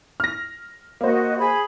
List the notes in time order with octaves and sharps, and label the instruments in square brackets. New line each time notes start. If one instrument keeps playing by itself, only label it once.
[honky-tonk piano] F6 A#6
[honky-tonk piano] A#3 C5 [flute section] F#4 D#5
[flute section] G#4 B5